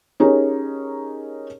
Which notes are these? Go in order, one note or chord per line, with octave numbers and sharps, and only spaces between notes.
C#4 D#4 G4 G#4 A#4